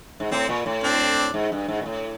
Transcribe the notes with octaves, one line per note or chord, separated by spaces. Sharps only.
G#2
A2 C4
A#2
A2
C4 D4
G#2
G2
G#2
A#2
A2